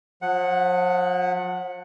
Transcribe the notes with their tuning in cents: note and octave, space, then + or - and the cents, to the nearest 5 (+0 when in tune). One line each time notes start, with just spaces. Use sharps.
F3 +45 F#5 +0